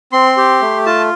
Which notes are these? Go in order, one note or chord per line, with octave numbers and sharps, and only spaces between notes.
C4 C6
G4
A3
F4 A5